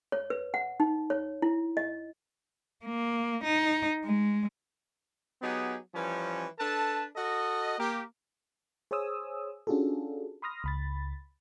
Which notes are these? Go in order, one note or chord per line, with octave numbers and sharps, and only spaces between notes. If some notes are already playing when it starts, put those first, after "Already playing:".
C#5
B4
F#5
D#4
C#5
E4
D#5
A#3
D#4
G#3
F#3 B3 D#4 G4 G#4
E3 F3 G3 C#4
D4 A4 B4 A5
F#4 A4 D#5
A#3 G4
G#4 C5 C#5 G#5 D#6 E6
C#4 D4 F4 F#4 G#4 A4
B5 C6 D#6 F6 A#6
C#2 B5 A6